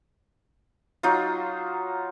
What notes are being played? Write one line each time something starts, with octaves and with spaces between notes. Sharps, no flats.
F#3 D#4 F4